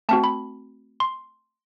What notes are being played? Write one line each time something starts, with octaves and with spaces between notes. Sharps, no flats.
A3 C4 F#4 A5
B5
C6